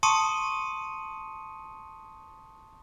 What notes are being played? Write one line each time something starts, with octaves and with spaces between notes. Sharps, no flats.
A5 C6 C#6 D#6 C#7 D#7